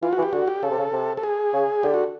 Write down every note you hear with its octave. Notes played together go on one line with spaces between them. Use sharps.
E3 F4
E3 F#4
G4
D3 F#4
G4
C#3 A4
C3
C#3
C3
A4
G#4
C#3
D3 G4
F#4